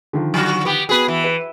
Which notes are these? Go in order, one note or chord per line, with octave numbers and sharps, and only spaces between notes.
D3 D#3 F3
F#3 F#4
B3 G4
B3 F#4 G#4 B4
E3
B4